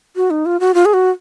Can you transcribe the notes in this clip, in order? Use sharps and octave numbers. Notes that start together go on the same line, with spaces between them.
F#4
D#4
F4
F#4
F4
G#4
F#4